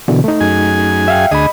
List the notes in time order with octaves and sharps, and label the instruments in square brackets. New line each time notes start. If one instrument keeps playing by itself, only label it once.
[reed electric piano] B2 D3 E3
A3 D#4
[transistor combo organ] F#2 G#4 G#5
[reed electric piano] E5 F5 G5
[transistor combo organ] D2 G#4 D#6 [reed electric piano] D#5 B5